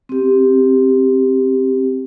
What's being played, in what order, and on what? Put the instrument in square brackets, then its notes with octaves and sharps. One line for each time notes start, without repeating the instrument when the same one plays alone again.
[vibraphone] C4 G4